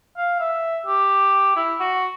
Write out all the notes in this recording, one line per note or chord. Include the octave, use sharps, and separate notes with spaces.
F5
E5
G4
E4
F#4